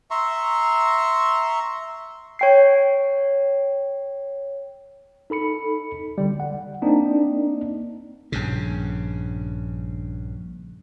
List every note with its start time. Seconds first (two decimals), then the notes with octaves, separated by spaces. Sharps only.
0.11 E5 A#5 C6 C#6
2.39 C#5 G5 C7
5.30 D#4 A4 B5 C#7
6.18 A1 D3 G3
6.40 F#5
6.82 A#3 C4 D4 D#4
8.32 A#1 G2 C#3